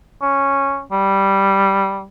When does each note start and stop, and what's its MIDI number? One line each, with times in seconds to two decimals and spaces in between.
0.22 0.81 61
0.92 2.05 55